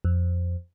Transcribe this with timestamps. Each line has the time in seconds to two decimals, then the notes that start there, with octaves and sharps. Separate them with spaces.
0.05 F2